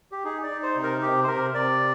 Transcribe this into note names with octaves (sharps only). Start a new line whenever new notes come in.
G4
D#4 G#4
D5
D#4
C5
C3
A#4
C3 G4
C5
C3 A#4
C3 D5